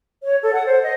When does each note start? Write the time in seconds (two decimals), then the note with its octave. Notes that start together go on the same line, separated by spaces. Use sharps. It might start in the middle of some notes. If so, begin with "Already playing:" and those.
0.23 C#5
0.41 A4
0.54 F#5
0.66 C5
0.82 D#5